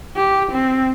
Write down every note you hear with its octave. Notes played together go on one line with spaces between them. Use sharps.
G4
C4